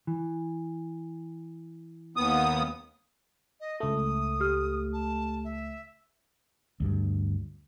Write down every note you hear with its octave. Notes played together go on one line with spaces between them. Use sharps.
E3
D#2 B3 D#6
D#5
C#2 A3 D#6
G4 F6
A5
E5
D2 G2